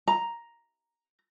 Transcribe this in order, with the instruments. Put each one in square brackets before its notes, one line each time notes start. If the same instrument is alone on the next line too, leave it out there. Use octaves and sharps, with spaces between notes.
[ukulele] A#5